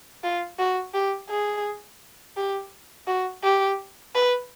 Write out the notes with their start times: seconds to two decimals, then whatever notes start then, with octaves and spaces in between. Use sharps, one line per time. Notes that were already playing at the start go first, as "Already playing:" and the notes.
0.23 F4
0.59 F#4
0.94 G4
1.29 G#4
2.37 G4
3.07 F#4
3.43 G4
4.15 B4